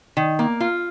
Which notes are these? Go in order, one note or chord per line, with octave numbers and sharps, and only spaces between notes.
D#3
A#3
F4